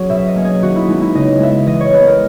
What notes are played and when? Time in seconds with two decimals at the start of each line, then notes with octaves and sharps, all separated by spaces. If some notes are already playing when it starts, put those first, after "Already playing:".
Already playing: F#3 C#4 F#4 G#4
0.09 B2 E5
0.28 D#5
0.35 A#3 C#4
0.45 G#4
0.62 D#3 F#4
0.76 E4
0.88 G#3 B3 D#4
1.02 E4
1.15 C#3 D#5
1.39 G#3 B3 E5
1.66 E3 D#5
1.80 C#5
1.93 G#3 B3 B4
2.07 A#4